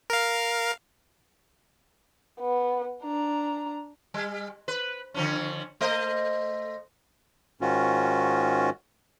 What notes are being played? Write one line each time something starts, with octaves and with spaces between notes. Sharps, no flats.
A#4 F5
B3
D4 A#5
G3
B4
D3 F3 C#4
A3 C5 D#5
G#2 D#3 C#4 F4 F#4